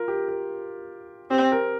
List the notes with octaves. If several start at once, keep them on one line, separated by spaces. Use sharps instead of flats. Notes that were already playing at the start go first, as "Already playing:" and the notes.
Already playing: F4 A#4
G4
A#4
C4 G4
A#4